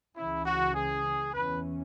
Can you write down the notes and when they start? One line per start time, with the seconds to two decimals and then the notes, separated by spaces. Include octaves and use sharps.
0.16 C#2 C#3 E3 C#4 E4
0.46 F#4
0.75 G#4
1.33 E2 E3 C#4 B4